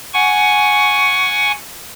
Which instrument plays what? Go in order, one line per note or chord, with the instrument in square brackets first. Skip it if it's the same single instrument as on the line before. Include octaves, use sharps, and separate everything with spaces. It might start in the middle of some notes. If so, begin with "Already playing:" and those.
[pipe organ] F#5 G#5 C#6